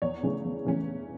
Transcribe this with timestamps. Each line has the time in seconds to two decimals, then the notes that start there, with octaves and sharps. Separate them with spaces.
0.02 E2 C#5
0.23 C#3 E3 A3 C#4
0.44 E2
0.65 C#3 E3 A3 C#4